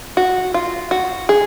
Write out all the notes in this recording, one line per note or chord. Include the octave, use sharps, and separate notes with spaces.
F#4
F4
F#4
G#4